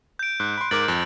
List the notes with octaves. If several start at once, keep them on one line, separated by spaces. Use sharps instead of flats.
G6 D7
G#2 F#6
B5 C6
G#2 A#4 D6 A6 D7 F#7
F2